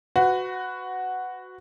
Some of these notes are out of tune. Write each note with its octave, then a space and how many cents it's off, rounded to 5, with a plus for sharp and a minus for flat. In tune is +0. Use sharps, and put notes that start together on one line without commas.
F#4 +0 B4 +25